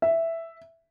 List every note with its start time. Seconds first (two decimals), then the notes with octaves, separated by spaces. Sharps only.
0.02 E5